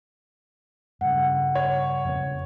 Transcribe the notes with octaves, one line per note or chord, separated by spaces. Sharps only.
G2 C#3 F#5
C#5
F2 C#3 B3